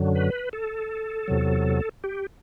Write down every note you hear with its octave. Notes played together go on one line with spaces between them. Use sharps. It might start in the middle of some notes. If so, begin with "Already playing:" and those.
Already playing: F#2 D3 F#3
B4
A4
E2 C3 F#3
G4